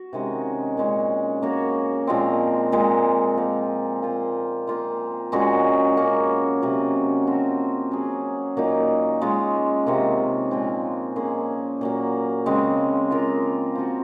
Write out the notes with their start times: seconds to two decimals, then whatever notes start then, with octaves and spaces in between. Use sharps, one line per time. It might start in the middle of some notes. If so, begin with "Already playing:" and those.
Already playing: F#4
0.13 C3 D#3 G#3 C#4
0.77 A#2 G#3 C#4
1.42 A#3 C#4 F#4 C#5
2.07 A#2 F3 G#3 C4
2.72 A#2 G#3 C4
3.38 F3 A#3 F4
4.02 A#3 F4 C5
4.67 A#3 F4 C5
5.32 A#2 G#3 C#4 F#4
5.97 A#3 C#4 F#4
6.62 C3 F#3 C#4
7.27 F3 C4 F#4
7.91 F#3 C#4 G#4
8.57 A#2 F#3 A#3 D#4
9.22 G#3 C#4 F4
9.86 C3 D#3 A#3 C#4
10.51 A#2 F3 G#3 C4
11.16 A#3 C#4 G#4 C5
11.81 A#2 F#3 A#3
12.46 C#3 G#3 C4
13.11 A#3 F4 A#4
13.75 F3 C4 F#4